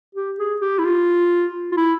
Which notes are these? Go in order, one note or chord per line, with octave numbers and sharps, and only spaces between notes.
G4
G#4
G4
E4
F4
F4
E4